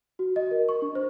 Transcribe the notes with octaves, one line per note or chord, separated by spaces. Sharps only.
F#4
D#5
A#4
C#6
D4
C5